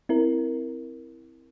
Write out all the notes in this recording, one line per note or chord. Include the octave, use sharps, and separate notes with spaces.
C4 E4 A#4